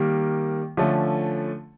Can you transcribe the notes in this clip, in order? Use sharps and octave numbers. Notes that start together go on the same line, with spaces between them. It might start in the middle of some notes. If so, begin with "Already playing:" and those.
Already playing: D#3 G3 A#3
D3 F3 A3 C#4